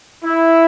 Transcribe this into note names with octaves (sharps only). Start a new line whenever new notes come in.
E4